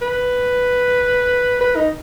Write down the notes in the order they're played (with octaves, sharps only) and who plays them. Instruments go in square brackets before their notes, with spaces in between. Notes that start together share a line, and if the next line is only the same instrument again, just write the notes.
[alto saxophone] B4
B4
D#4